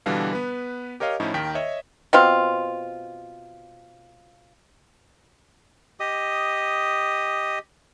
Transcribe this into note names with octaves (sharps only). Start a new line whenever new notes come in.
B2 D3 E3 G3 D4 F5
B3 B4
G4 A#4 C#5 D#5 F5
A2 F3 C#4 D#4 E4
D#2 D#3 A#4 G5 B6
C#5 D#5 E5
B2 C4 F4
G4 D#5 D#6